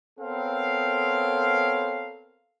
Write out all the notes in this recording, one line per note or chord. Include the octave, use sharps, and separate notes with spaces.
B3 C4 A4 A#4 C#5 F5